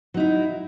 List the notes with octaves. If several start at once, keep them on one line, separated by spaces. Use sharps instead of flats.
F#3 D#4 E4